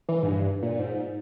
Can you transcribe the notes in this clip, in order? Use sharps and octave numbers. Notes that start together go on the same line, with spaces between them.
E3
G#2
G2
A#2
G#2